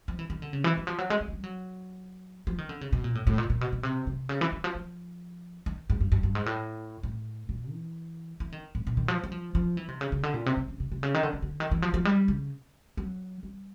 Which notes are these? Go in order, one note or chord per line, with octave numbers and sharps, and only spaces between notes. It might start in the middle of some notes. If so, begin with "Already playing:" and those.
F3
E3
D#3
D3
C#3
E3
E3
F3
F#3
G#3
G#3
F#3
G3
F#3
F3
D#3
D3
C#3
B2
A#2
A2
A2
A#2
A#2
B2
B2
C3
C3
C#3
E3
D#3
F3
F3
D#3
G#2
G2
G2
G2
G#2
A2
A2
A#2
E3
E3
D#3
A2
A#2
D#3
F3
F#3
F3
F3
E3
C3
C#3
C#3
D3
A#2
C3
C3
C#3
C3
C3
C#3
D#3
D3
C#3
D3
D#3
E3
F3
F3
G3
C#3
F#3
G3